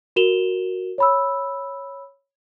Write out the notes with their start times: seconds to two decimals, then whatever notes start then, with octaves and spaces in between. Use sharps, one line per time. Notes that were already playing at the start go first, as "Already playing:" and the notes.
0.16 F#4 A#4 E7 F7 G7
0.98 C#5 B5 E6